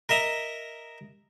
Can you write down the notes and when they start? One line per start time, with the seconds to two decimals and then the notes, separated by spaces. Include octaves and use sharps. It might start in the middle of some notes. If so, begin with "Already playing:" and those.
0.09 A#4 D#5 E5 A#5